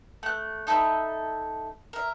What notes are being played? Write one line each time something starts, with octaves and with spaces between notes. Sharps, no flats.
A3 F#6
D#4 A4 E5 B5
A#4 E5